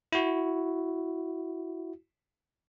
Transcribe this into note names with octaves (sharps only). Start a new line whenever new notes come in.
E4 F#4